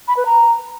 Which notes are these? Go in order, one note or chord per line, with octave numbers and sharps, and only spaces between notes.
B5
B4
A#5